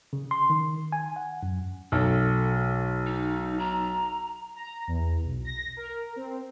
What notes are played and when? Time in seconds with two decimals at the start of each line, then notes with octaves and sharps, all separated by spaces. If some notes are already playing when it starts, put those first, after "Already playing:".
0.13 C#3
0.31 C6
0.50 D#3
0.92 G#5
1.16 F#5
1.43 F#2
1.92 B1 A4
3.06 D#4
3.59 A#5
4.56 A#5
4.87 E2
5.24 B1
5.45 A#6
5.77 A#4
6.16 C4